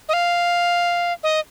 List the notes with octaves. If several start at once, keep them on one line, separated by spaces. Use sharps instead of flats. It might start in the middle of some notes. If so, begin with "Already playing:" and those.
D#5
F5
D#5